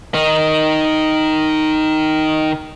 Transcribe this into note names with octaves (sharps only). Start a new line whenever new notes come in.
D#3 D#4